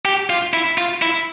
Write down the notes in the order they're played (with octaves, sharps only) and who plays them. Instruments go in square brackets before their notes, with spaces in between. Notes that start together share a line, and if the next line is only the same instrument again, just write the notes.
[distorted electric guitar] G4
F4
E4
F4
E4